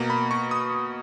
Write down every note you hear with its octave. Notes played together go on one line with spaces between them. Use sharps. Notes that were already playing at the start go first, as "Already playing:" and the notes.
Already playing: B2 A#3 A#5
B5
C#6
D#6